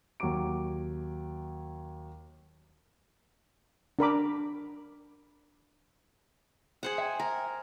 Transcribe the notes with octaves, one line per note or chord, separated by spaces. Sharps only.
D#2 F#3 F#4 A#5 D6 D7
D4 A#4 B5 D6
G#4 C5 F#5
E5 G5 G#5
A#4